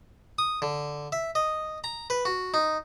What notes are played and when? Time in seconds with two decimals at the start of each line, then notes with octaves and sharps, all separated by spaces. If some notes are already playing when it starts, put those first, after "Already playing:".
0.38 D#6
0.62 D3
1.12 E5
1.35 D#5
1.84 A#5
2.10 B4
2.25 F#4
2.54 D#4